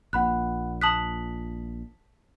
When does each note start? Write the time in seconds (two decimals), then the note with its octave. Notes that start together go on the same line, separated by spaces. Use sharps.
0.13 A#1 A#2 F#5 B5 F#6
0.81 A5 D#6 F#6 B6 F#7